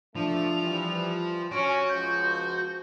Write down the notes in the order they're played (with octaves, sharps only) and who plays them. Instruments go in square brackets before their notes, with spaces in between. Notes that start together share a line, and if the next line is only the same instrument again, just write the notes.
[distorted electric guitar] F3 [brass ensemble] A3 D4 [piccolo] F7
[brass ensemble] E3 G3
[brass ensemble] C#4 [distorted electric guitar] F#4 [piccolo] D7
[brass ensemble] C#2 F3 [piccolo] G6